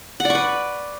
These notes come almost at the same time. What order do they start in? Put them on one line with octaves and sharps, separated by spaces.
F#5 D5 C#6 B4